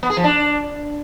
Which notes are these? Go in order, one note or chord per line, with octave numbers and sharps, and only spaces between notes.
B3
G#4
F3
D4